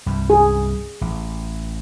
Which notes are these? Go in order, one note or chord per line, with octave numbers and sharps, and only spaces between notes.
C2 G2
G#4
A1